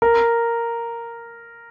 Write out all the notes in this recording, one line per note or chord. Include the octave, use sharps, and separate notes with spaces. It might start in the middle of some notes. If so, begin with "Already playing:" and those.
A#4